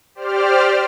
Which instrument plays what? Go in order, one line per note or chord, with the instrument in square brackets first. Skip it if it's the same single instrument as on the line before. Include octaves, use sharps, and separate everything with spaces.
[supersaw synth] G4 C5 D5 F6